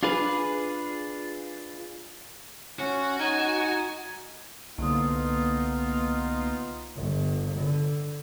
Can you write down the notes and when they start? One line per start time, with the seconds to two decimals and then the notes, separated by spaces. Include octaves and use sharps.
0.03 D4 F4 G#4 B4
2.79 C#4 F#4
3.19 D#4 G#5
4.78 C2 D3 A#3 B3 D#4 F4 D#6
6.96 G1
7.59 D3